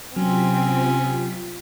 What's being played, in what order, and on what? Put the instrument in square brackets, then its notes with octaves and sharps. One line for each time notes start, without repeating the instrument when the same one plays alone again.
[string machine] C3 F4 B6 [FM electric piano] F#3 [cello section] C4 [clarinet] C#4